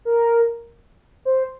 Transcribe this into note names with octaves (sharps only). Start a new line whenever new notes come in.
A#4
C5